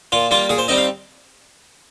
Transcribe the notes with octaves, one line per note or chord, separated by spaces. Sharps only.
A#2 F4
G3 A#3 F4
A#2 G#4
C5
G3 C4 D#4 D#5
F5